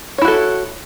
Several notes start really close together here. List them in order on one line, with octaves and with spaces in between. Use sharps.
C#5 E4 F#4 A4